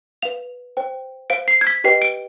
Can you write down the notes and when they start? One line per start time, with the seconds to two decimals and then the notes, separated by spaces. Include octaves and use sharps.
0.22 B4 F5 F7
0.77 C5 G5
1.30 C5 F5 D7
1.48 C7
1.61 G#6
1.67 B6
1.84 G4 B4 D#5 G5 C7
2.02 D7